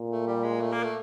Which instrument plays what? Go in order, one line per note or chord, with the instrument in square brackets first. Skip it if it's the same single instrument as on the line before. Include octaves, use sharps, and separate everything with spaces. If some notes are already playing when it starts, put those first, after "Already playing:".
Already playing: [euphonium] A#2
[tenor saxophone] A3
G3
G#3
A3
A#3
A3